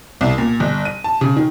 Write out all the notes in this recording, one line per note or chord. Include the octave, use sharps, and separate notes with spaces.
C2
A#2
G1
D#7
A5
C#3
D#3